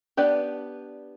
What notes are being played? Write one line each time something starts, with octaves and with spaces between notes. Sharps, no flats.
B3 D4 G4 B4 D5